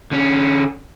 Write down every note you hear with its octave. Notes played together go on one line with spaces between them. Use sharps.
D3 C#4